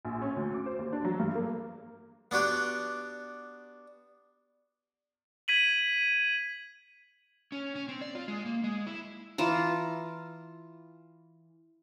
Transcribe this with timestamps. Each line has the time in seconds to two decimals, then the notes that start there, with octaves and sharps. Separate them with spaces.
0.05 A#1
0.22 C#4
0.36 D2
0.54 D6
0.66 C5
0.79 D#2
0.93 D4
1.05 F#3
1.20 G2
1.35 A#3
2.31 B3 D4 F#4 G4
5.48 G#6 B6 D#7 F#7
7.52 C#4
7.76 C#4
7.89 C4
8.01 D5
8.15 F4
8.28 G#3
8.46 A#3
8.64 G#3
8.86 E4
9.38 E3 F4 A5 A#5